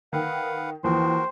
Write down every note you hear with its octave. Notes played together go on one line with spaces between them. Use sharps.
D#3 B4 F5 F#5
D#2 E3 F3 F#4 A#4 C5